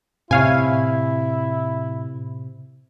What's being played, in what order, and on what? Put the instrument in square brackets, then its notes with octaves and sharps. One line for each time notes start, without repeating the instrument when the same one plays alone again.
[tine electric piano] A2 [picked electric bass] C3 [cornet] E4 [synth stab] C#5 F5 G#5